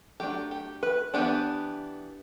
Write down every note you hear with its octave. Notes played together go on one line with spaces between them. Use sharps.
F#3 A3 D4 G4
G4
B4
E3 B3 D4 G4